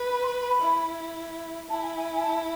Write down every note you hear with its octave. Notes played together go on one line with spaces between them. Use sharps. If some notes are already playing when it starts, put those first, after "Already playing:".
Already playing: B4
B5
C6
B5
B5
E4
E4 A5
G#5
G#5
G#5
A5